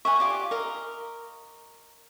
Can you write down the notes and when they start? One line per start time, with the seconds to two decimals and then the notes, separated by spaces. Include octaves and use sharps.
0.05 E5 F#5 G#5 C#6
0.20 F4 G4 D5
0.51 A#4 D#5